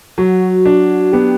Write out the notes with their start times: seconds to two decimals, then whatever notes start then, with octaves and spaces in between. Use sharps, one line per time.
0.18 F#3 F#4
0.66 D4
1.12 B3 G4